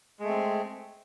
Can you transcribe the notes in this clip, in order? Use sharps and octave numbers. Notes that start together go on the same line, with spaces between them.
G#3 A3 C4